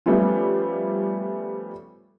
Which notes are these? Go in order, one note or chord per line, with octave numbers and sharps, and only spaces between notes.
F3 G3 A3 B3 C#4 F4